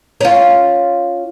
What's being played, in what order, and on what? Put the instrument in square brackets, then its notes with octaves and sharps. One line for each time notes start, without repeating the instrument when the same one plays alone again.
[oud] C#4 F4